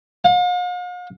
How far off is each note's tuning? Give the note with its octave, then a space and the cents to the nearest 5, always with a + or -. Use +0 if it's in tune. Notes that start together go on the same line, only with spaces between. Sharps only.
F5 +45